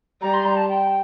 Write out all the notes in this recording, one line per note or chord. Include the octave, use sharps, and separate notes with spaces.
G3 A#5
C6
A#5
A5
G5